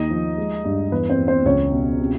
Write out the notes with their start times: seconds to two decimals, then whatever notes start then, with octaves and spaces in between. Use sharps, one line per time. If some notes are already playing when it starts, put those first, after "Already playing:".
Already playing: D#2 D#4 D#5
0.11 F3
0.37 G#3
0.65 G2
0.92 E2 B4
1.09 C4 C5
1.18 E2
1.27 C4 C5
1.45 C#2 C#4 C#5
1.72 B2
2.00 C3